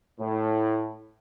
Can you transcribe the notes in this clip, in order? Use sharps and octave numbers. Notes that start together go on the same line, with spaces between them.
A2